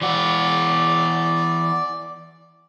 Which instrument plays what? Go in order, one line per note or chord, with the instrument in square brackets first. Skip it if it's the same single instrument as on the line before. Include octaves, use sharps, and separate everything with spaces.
[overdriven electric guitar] E3 F#4 [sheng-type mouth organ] D5